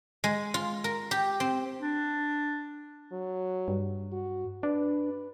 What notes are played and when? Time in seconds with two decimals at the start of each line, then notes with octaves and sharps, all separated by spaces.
0.24 G#3
0.54 F4
0.84 A#4
1.11 G4
1.40 C4
1.79 D4
3.12 F#3
3.68 G2
4.12 F#4
4.63 D4 B4